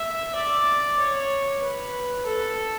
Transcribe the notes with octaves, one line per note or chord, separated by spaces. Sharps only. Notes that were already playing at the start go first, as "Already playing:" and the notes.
Already playing: E5
D5
C#5
B4
A4